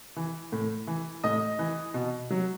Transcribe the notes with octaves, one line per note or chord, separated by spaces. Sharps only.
E3
A2
E3
A2 D#5
E3
B2
F#3